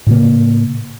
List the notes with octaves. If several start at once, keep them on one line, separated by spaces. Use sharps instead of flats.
A2 C#3 A#3